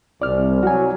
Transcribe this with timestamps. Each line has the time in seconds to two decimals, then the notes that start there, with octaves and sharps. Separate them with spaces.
0.22 C2 D5 F6
0.63 F#3 F#4 G#5